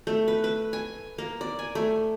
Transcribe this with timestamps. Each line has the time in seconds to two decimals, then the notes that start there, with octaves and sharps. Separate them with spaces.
0.07 A3
0.28 B4
0.44 B4
0.73 G#5
1.18 A#3
1.41 D5
1.59 G#5
1.75 A3